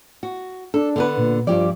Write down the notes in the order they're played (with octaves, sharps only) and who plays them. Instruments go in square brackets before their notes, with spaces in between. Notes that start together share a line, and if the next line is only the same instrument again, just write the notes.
[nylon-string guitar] F#4
[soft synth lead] D4 [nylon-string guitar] A4
[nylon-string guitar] D3 B3 B4
[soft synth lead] A#2
[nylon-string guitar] G2 G4 D5 [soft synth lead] F3